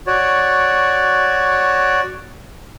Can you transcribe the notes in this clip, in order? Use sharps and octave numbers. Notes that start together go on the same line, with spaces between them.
F#4 C#5 D5